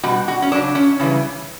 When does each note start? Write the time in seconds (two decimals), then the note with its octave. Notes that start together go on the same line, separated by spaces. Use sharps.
0.03 B2 G3 F#4
0.28 F#4
0.42 C#4
0.52 F#3 D4
0.55 C#3
0.75 C#4
1.00 C#3 E3 G3